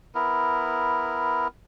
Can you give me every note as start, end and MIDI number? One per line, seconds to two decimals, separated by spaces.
0.15 1.47 59
0.15 1.47 64
0.15 1.47 70